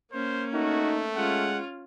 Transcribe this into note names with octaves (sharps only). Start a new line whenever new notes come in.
A#3 C#4 C5
A3 D#4 F#4
G#3 C#4 F4 F#5